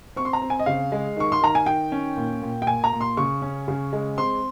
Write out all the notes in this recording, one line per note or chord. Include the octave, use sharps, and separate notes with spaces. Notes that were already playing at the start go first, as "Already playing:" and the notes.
C4 C#6
C6
A#5
C4
G#5
D#5
C#3 F5
G#3
D#3 C#6
C6
D#3 A#5
G#5
D#3 G5
C#4
A#2
A#2
G5
A#2 G#5
A#5
A#2
C6
C#3 C#6
C#4
C#3
G#3
C4 C6